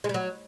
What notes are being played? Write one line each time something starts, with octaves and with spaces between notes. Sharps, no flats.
G#3
G3
F#3